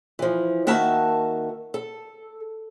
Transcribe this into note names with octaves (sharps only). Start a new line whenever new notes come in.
E3 F3
D#3 A#3 F#4 E5 A5
A4